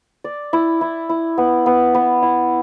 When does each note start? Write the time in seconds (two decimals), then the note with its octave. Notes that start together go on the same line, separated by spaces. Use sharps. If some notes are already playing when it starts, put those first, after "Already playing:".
0.24 D5
0.53 E4
0.81 E4
1.09 E4
1.38 B3
1.66 B3
1.94 B3
2.22 E4